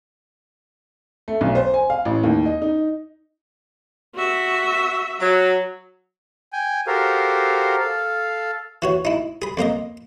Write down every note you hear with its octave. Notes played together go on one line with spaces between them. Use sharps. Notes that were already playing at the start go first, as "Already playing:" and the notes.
A3
B1
C5
G#5
F5
A1
D#2
D#5
D#4
F#4 E5
F#3
G5 G#5
F#4 G4 A4 A#4 C5 F5
A4 F5
E3 F#4 C#5
D#4 E4
G#4 B5
F2 A#3 A#4 D#5